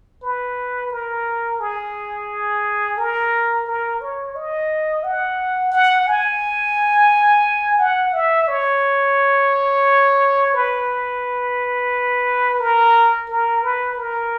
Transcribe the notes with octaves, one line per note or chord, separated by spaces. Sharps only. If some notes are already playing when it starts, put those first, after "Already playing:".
B4
A#4
G#4
A#4
A#4
C#5
D#5
F#5
F#5
G#5
F#5
E5
C#5
B4
A#4
A#4
B4
A#4